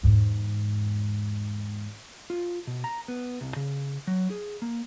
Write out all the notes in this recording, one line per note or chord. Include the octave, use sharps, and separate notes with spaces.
E2 G#2
F4
B2
A#5
B3
C2
C#3
F#3
G#4
A#3